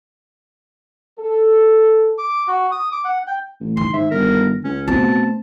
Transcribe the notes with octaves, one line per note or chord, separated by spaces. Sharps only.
A4
D6
F#4
D#6
D6
F#5
G5
A1
D#3 C6
G#2 E5
G1 A#4
C#2 C#4
B2 A3 C4 A5